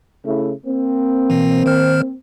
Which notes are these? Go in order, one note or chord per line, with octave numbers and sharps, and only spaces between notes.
C#3 A3 E4
A#3 C4
B2 E3
D#3 C5 F6